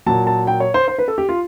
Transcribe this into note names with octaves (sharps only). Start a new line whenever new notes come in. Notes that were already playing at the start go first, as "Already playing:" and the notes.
A#2 F#3 A5
A5
G5
C#5
C5
C5
B4
A4
G4
F4